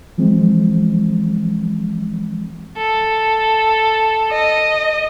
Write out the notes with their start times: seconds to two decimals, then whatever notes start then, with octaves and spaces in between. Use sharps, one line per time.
0.18 E3 F3 G#3 C4
2.77 A4
4.33 D#5